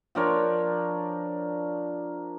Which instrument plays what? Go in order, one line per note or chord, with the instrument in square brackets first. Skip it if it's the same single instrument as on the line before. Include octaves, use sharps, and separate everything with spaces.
[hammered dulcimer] F3 D4 A#4 C#5